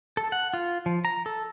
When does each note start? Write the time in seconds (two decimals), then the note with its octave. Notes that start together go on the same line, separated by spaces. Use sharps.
0.17 A4
0.32 F#5
0.54 F4
0.86 F3
1.05 A#5
1.26 A4